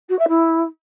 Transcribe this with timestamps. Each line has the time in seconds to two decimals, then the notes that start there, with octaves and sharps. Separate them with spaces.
0.09 F#4
0.18 E5
0.28 E4